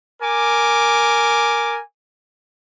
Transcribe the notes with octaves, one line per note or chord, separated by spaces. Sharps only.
A#4 G#5 D6